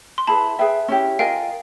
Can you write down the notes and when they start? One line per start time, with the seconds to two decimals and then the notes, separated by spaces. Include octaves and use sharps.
0.18 C6
0.27 E4 G#4 B4 A5 B5
0.59 G#4 B4 E5 G5
0.88 C#4 E4 G4
1.19 F4 A#4 D#5 F5 G5 G#5